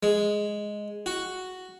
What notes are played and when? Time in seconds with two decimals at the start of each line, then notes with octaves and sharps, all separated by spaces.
0.03 G#3
1.06 F#4